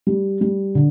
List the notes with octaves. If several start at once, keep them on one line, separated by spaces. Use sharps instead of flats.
G3
G3
D3